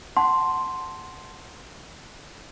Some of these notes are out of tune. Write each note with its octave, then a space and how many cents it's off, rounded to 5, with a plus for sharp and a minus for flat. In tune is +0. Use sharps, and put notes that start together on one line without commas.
F#5 +5 A5 +0 C6 +0